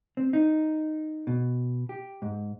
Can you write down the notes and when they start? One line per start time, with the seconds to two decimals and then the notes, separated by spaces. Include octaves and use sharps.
0.17 C4
0.33 D#4
1.27 B2
1.89 G4
2.22 G#2